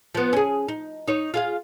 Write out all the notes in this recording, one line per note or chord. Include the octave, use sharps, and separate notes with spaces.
F3 B3
C#4 G#4
D#4
D#4 C#5
F4 G#4 F5